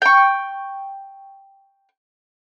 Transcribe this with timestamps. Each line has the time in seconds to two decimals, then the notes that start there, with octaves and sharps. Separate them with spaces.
0.02 G5 C#6